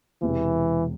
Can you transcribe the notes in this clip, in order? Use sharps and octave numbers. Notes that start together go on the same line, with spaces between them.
E1 E2 C3 E3